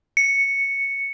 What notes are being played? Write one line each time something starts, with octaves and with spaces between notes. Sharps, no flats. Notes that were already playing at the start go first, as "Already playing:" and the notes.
C#7